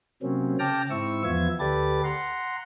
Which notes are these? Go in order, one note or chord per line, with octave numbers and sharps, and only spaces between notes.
C3 F#3 A#3 C4 C#4
C#3 G5 A5 D6 F6 A#6
G#2 C4 E4 C#6 E6
E2 F3 B3 F4 E5 G#6
D2 G4 A4 B4 D5 A6
F#5 A#5 C6